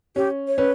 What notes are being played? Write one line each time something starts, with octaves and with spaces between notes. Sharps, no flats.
C#4 G4
C#5
C#4 B4